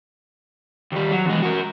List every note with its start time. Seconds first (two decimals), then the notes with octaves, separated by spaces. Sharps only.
0.92 D#2 G3
1.12 F#3
1.26 E2 G#3
1.43 F#4 A#4